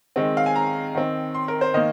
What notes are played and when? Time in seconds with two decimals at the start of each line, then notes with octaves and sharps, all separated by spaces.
0.16 D#3 G#3 C4
0.37 F5
0.46 G#5
0.56 A#5
0.95 D#3 C4
1.35 C6
1.48 A#4
1.61 C5
1.74 D#3 A#3 D#5